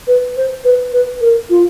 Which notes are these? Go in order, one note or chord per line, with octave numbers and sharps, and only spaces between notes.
B4
C5
B4
B4
A#4
F4